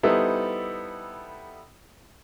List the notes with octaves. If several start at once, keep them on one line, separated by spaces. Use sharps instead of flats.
G3 B3 D#4 E4 A4 C5